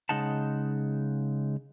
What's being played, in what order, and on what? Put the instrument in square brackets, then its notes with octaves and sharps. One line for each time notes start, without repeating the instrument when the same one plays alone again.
[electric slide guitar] C#3 G#3 D#4 F#5 A5